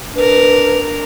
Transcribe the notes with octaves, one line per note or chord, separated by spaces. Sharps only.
D4 A#4 B4